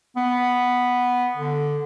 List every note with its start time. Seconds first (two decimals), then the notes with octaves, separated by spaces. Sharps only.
0.16 B3
1.36 D3